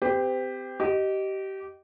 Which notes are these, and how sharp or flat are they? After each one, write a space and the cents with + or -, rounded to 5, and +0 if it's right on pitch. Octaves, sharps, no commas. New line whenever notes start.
C4 -30 G4 +10 C5 -40
G4 -25 D#5 -5